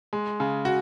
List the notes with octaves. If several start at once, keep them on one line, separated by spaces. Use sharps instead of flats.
G#3
C#3
F#4